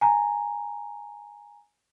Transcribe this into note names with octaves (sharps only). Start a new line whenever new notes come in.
G#5 A#5